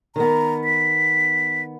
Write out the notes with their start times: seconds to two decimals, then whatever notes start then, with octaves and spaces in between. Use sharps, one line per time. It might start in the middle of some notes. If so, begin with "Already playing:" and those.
0.16 D#3 B3 A#5
0.64 B6